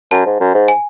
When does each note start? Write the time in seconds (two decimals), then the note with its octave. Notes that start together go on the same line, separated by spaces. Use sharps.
0.11 F#2 A5
0.26 G#2
0.40 F#2
0.54 G#2
0.68 G#5